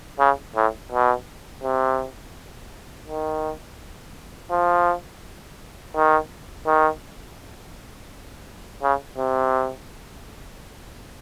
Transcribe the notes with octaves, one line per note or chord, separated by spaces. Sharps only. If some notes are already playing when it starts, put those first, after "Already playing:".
C#3
A2
B2
C3
D#3
F3
D#3
D#3
C#3
C3